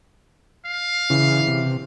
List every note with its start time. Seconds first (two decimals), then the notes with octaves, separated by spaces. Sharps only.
0.66 F5
1.10 C#3 E3
1.48 C3